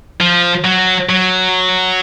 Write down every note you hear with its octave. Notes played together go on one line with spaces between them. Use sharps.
F3
F#3
F#3